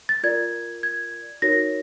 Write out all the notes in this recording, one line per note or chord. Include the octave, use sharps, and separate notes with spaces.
A6
F4 A#4 D5 G#6
G#6
D#4 F#4 A#4 C#5 A#6